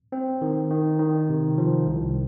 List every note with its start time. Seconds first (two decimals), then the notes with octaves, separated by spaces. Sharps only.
0.12 C4
0.42 D#3
0.71 D#3
0.99 D#3
1.29 C3
1.58 F3
1.87 C2